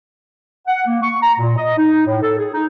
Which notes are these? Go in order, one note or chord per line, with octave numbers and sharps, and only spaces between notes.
F#5
A#3
C#6
A#5
A#2
D#5
D#4
A2
A4
G#4
D#4